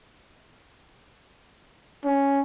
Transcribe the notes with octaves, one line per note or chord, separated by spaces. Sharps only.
C#4